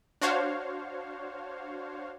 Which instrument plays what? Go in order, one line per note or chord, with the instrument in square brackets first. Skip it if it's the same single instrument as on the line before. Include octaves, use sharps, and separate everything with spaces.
[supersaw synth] D4 F#4 C5 C#5 F5